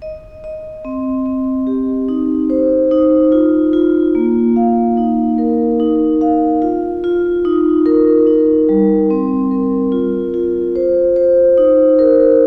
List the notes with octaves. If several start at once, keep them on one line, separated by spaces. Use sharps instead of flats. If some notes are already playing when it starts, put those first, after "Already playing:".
D#5
D#5
C4
C4
G4
D#4
C5
D#4
F4
F4
A#3
F5
D#4
A#4
D#4
F5
F4
F4
D#4
A#4
D#4
G3
C4
A#4
F4
F4
C5
C5
D#4
A#4